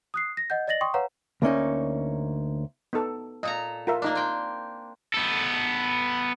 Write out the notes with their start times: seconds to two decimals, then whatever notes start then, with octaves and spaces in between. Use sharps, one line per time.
0.14 D#6 F#6 C7
0.37 A#6
0.50 D#5 F#5 G6
0.68 D5 D#5 A6 A#6 F#7
0.81 G5 C6 C#6 D#6
0.94 B4 C#5 F5 F#5 A#5
1.42 D2 A#3 C#4 D#4
2.93 B3 D#4 A4
3.43 A#2 A4 D#5 A#5
3.87 F4 A#4 E5
4.02 A#3 D4 D#4 D5
4.15 C4 G5
5.14 B3 A4